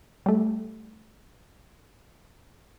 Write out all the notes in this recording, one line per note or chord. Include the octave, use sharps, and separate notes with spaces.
G3 A3